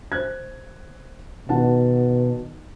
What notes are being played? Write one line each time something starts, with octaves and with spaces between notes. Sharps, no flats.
C5 F#6 G#6
B2 D#3 F#5 A5